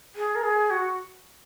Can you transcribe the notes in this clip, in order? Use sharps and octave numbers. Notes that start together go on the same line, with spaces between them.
G#4
A#4
G#4
F#4